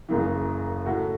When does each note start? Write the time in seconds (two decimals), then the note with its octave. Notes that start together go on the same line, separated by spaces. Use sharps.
0.09 F#1 F#2 C#3 E3
0.86 A2 A3 F#4